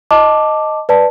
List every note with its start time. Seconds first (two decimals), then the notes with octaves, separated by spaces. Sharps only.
0.11 D#5 A5 D6
0.89 B4 D5 A5